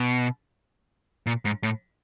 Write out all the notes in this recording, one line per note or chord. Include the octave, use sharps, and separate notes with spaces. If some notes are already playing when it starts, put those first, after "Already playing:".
Already playing: B2
A#2
G#2
A2